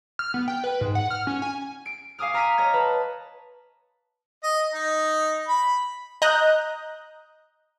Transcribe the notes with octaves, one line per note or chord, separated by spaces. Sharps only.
F6
B3
G5
B4
G#2
F#5
F6
C#4
G#5
D7
F5 G#5 D6 D#6 F6
G#5 A#5 C#6 F6 B6 D#7
C#5 D#5 A#5 G#6
B4 A5
D#5
D#4
B5
D#5 A#5 F#6 G6